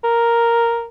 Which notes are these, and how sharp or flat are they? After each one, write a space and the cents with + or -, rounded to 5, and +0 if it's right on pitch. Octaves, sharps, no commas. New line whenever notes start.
A#4 +0